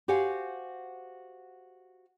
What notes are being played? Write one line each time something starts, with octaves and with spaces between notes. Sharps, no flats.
F#4 G4 C5 F5 F#5 G#5